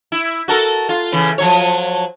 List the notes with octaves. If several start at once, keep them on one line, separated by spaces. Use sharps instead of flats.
E4
F#4 A4 A#4
F4
C#3 E3
F3 F#3 C#5